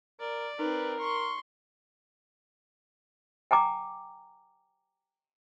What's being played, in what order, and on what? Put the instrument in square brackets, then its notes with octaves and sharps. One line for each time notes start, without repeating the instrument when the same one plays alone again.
[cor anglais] A#4 [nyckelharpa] D5
[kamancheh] C4 B4 [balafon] D#4 [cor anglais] A#4
[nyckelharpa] C6 [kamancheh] C#6
[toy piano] G5 G#5 A#5 D6